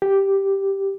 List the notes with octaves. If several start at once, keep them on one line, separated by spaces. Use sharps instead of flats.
G4